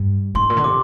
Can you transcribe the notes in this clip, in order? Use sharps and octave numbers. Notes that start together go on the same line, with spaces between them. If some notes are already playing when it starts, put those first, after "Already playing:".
Already playing: G2
G#2 C6
A#2
D3
C3 D6